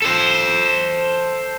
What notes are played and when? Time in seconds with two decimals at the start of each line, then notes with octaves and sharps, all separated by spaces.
0.02 A4 C5